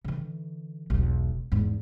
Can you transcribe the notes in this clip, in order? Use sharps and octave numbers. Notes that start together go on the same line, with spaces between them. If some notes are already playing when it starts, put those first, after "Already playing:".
D3 E3
E1 B1
E2 G#2